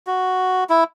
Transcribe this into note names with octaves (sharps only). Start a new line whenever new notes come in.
F#4
E4